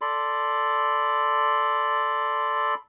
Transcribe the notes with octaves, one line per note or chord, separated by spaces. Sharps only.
A4 D5 B5 C6